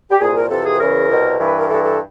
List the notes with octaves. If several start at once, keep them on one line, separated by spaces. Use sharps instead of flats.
G4
C2 A#2 G#4
A#4
F2 C3 E3 A4
G#4
B4
E2 C#3 E3 A#4
C2 B2
G2 E3
B4
A#4
G2 E3 A4
A4